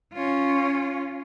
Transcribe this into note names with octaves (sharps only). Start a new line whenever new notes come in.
C#4 F4